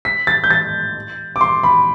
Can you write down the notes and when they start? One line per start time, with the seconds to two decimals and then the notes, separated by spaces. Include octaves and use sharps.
0.05 B6
0.27 A6
0.44 G6
0.51 A6
1.36 D6
1.41 C6
1.63 B5